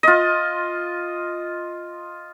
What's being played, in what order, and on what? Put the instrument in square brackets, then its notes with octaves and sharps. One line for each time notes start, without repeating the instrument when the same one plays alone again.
[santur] F4 D#5